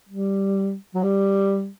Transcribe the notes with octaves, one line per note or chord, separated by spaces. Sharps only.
G3
F#3
G3